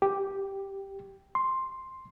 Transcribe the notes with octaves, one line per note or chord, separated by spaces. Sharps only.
G4
C6